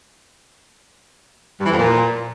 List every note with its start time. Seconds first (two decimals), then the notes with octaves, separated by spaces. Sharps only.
1.60 G2
1.66 E3
1.72 F2
1.77 A#2